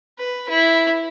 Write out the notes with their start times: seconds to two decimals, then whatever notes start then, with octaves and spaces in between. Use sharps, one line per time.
0.19 B4
0.49 E4